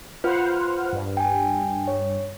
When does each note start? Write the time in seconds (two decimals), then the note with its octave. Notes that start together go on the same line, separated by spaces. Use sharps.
0.24 F4 B4 C5 F#5 F6
0.92 G2
1.17 G5 G#5
1.88 C#5